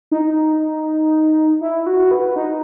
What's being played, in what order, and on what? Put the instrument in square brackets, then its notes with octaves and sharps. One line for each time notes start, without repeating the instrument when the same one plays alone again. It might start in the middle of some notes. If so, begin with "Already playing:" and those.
[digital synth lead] D#4
E4
F#4
B4
D#4